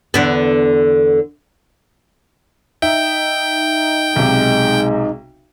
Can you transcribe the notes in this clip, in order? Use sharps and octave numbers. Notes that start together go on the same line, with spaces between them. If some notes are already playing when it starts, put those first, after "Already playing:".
E2 D3 B3
D#4 E5 G5
B1 C3 G#3